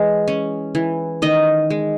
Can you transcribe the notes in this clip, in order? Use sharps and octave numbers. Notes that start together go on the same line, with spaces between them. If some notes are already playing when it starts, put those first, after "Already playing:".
Already playing: E3 G#3
C#4
E3
D#3 D#5
G#3